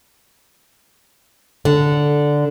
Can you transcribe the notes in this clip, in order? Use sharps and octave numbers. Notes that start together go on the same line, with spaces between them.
D3